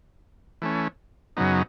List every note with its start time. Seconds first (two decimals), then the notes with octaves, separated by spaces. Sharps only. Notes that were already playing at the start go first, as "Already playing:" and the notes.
0.62 E3 A3 C#4
1.37 F#2 C#3 F#3 B3 D#4